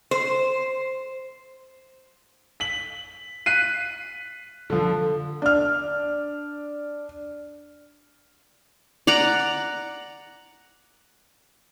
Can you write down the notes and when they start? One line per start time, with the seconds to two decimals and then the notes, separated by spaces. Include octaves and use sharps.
0.11 C5
2.60 B6 F#7
3.46 F#6 B6 C7 D#7
4.70 D3 F3
5.42 D4 F6
9.07 D5 F#5 A#5